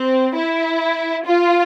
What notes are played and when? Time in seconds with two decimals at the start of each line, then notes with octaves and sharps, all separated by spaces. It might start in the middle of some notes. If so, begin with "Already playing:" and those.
Already playing: C4
0.37 E4
1.26 F4